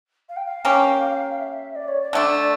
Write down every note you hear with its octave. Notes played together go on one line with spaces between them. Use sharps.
F5
G5
F5
A#3 C#4 G4
E5
D5
C#5
D5
D3 A3 D4